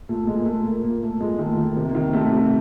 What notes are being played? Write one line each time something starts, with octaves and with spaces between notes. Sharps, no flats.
A#2 A3
A#2 G#3
A#3
A#2 A3
A#2 A#3
A#2 A#3
A#2 A3
A#2 G#3
D#3 A3
D#3
A#3
C3
A#3
D#3
C3 A3
C3